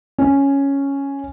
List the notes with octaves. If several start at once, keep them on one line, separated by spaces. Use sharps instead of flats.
C#4